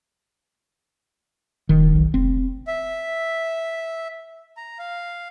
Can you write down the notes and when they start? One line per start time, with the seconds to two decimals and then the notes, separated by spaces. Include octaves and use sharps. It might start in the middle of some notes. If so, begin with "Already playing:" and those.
1.69 E1 D#3
1.94 B1
2.14 F1 C4
2.67 E5
4.57 A#5
4.79 F5